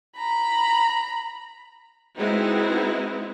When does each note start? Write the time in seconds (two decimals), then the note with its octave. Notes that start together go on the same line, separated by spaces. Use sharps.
0.17 A#5 B5
2.17 G#3 B3 C4 D#4 E4 F#4